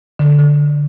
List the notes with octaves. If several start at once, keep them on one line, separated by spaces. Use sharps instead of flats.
D3
D3